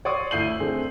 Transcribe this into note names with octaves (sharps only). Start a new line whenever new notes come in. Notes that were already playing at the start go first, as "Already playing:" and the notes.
C#5 D5 F#5 C6 C#6 D#6
D2 E4 G6 C7 D#7 F#7
A3 C4 D4 G#4